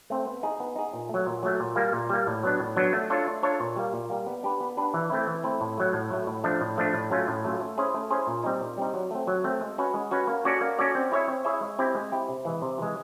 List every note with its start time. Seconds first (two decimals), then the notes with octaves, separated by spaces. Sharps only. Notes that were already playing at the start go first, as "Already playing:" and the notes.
0.10 A3 C4
0.26 B3
0.43 D#4 G#4
0.60 B3
0.76 D#4 G#4
0.94 A#2
1.09 A3
1.14 F#3
1.26 A#2
1.43 F#3 A3
1.60 A#2
1.76 G3 A#3
1.93 A#2
2.09 G3 A#3
2.27 A2
2.43 F#3 B3 D4
2.60 A2
2.76 F#3 B3 D4
2.93 A3
3.10 D4 F4 A4 C#5
3.27 A3
3.43 D4 F4 A4 C#5
3.60 A#2
3.76 G3 A#3
3.93 A#2
4.10 G3 A#3
4.27 B3
4.43 D4 G4 B4
4.61 B3
4.77 D4 G4 B4
4.94 E3
5.10 A3 C4 E4
5.27 E3
5.44 A3 C4 E4
5.61 A2
5.78 F#3 A3
5.93 A2
6.10 F#3 A3
6.27 A2
6.44 F3 A3 D4
6.61 A2
6.78 F3 A3 D4
6.94 A2
7.10 F#3 A3 C#4 F4
7.28 A2
7.45 F#3 A3 C#4 F4
7.60 A3
7.78 C#4 E4 G#4 C5
7.94 A3
8.10 C#4 E4 G#4 C5
8.27 A#2
8.44 G3 C4 D#4
8.61 A#2
8.78 G3 C4 D#4
8.94 F#3
9.11 A3 C4
9.27 F#3
9.44 A3 C4
9.61 G#3
9.78 C#4 F#4 B4
9.94 G#3
10.11 C#4 F#4 B4
10.27 A#3
10.45 C#4 F#4 A4 D5
10.61 A#3
10.79 C#4 F#4 A4 D5
10.95 C4
11.12 E4 G#4 C#5 E5
11.28 C4
11.45 E4 G#4 C#5 E5
11.61 G#3
11.79 C4 E4 G4
11.95 G#3
12.12 C4 E4 G4
12.29 C3
12.45 E3 G#3
12.62 C3
12.78 E3 G#3